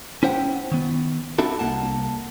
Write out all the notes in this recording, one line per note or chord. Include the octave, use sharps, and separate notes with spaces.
C#4 E4 C5 F#5 G5
D#3 B3
C4 D4 E4 F#4 A4
C2 G2 A#3 F#5 A5